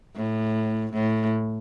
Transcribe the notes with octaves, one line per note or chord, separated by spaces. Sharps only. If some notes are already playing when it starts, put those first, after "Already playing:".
A2
A2